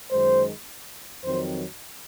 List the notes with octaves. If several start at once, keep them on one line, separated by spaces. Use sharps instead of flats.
F#2 D#3 G#3 C5
F2 D#3 F#3 C4 C5